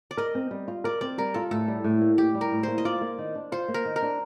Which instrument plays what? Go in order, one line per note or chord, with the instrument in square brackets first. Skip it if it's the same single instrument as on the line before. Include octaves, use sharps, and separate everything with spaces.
[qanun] D5
[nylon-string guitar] A#4 [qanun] D#5
[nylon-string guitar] C4
G3
F4
[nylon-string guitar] A#4 [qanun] D5
[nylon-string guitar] C4 [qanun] D5
[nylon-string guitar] G3 [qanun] A#4
[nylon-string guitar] F4 [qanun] A4
[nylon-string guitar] A2 [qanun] A4
[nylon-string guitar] G3
A2
A#3
[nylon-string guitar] A2 [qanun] G4
[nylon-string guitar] G3
[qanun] A#4
[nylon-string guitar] A2
[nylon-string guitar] A#3 [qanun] C5
[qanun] D#5
[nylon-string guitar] F4 [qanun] D5
[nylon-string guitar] A#3
D#3
D4
[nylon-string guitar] F4 [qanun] C5
[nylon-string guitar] A#3
[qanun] A#4
[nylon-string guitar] D#3
[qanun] A#4
[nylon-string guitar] D4